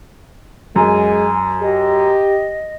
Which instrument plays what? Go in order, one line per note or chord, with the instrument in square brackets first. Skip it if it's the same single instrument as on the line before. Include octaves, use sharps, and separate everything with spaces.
[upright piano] F#2 [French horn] G#3 [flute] G#5
[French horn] G4 [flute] D#5